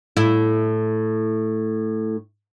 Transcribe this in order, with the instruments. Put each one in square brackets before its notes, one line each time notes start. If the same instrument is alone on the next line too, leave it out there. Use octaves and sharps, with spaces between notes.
[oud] A2 E4